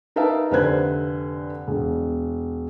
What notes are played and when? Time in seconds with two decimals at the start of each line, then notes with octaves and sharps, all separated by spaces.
0.16 D#4 A#4 B4 E5 F5 A5
0.51 F1 D3 B4 C5 F#6 G#6
1.68 E1